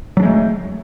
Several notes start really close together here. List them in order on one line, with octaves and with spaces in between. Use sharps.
F#3 D4 G#3 A3